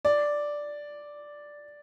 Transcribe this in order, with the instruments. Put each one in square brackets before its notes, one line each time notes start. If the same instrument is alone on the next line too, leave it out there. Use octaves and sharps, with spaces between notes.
[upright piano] D5